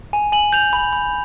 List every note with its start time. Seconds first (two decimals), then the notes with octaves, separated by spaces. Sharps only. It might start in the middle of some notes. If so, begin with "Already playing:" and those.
0.13 G#5
0.32 G#5 F#7
0.53 G6 F7
0.73 B5
0.93 B5